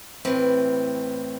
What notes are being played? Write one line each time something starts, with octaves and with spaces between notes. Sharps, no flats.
A2 E3 C4